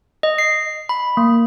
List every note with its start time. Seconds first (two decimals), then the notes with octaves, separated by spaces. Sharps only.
0.23 D#5
0.38 C7
0.89 B5
1.17 A#3